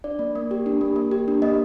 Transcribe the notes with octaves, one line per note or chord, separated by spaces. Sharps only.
D4 D5
A#3
A#3
G4
D4
A#3
A#3
G4
D4
A#3 D#5